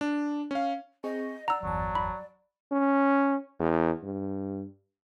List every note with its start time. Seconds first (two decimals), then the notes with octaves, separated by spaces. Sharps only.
0.01 D4
0.51 C#4 F5
1.04 C4 G#4 D#5 C#6
1.48 D5 F#5 A#5 E6
1.63 G1 E2 F#3 A5
1.95 B5
2.72 C#4
3.60 E2
4.03 G2